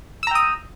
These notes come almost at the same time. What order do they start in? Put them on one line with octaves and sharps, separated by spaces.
E6 A#5 G5 D#6